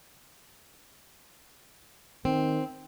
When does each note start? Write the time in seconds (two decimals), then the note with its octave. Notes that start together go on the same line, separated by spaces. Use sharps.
2.25 D#3 C4